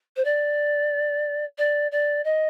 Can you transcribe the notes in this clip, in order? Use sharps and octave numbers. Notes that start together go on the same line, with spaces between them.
C5
D5
D5
D5
D#5